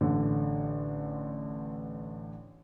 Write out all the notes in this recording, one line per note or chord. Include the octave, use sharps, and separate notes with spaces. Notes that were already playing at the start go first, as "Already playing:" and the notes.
A1 D3